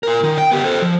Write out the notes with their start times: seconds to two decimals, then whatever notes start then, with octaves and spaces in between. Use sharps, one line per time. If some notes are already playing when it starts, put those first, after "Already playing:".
0.03 F4 A#4
0.23 D#3
0.38 G5
0.51 B3 G4
0.65 A4 C5
0.82 F3